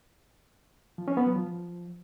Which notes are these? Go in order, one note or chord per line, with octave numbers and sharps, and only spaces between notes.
F3
C#4
B3
F#3
F3